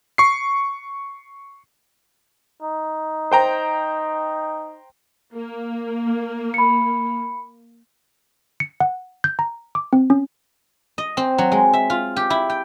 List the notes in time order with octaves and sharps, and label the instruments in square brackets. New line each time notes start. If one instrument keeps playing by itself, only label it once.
[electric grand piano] C#6 C7
[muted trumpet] D#4
[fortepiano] C5 G5 A#5
[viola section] A#3
[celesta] B5 C#7
[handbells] C#7
F#5
G6
A#5
D6
C4
C#4
[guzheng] D#5
C4
F#3
G#3
E5
F4
G4
E4
G5